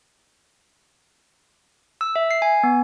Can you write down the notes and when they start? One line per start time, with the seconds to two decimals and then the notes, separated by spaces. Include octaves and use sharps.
2.01 E6
2.16 E5
2.31 C7
2.42 G#5
2.63 B3